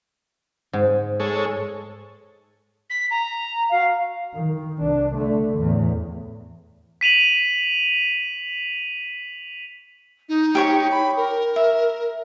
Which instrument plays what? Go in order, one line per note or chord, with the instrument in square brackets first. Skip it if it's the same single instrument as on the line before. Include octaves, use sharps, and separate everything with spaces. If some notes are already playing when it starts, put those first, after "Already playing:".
[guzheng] G#2
[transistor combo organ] G#3 A4 C#5
[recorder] B6
A#5
[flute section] F#4 F5
[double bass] D#3
C2 D4
D3 A3
E2 A2
[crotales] B6 D#7 F7 F#7
[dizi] D#4
[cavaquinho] G4 C#5 C#6
[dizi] B5
A#4
[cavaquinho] E5